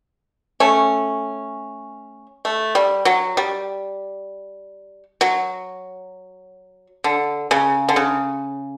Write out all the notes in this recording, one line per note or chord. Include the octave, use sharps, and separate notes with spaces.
A3 C#4
A3
G3
F#3
G3
F#3
D3
C#3
D3
C#3